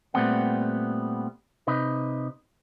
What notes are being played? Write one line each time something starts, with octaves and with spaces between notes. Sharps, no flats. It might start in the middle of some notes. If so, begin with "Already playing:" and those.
A#2 G3 A3 B3 C4 F#5
C3 D#4 B4